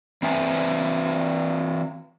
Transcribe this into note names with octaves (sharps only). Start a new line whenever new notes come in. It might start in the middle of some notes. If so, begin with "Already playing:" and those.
E3 C4 B4 E5 G#5